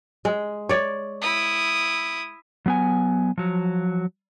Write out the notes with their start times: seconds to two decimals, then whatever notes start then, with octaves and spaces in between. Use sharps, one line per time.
0.25 G#3
0.69 C#5 D5
1.22 E4 D#6
2.66 F#3 B3 G#5
3.38 F3 F#3